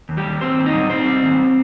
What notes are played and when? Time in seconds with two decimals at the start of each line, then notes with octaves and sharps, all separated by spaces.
0.09 D#2
0.17 G3 G4
0.26 D#2
0.41 D#2 C4 C5
0.58 D#2
0.66 D#4 D#5
0.74 G3
0.90 G3 C4 C5
1.06 G3
1.23 D#2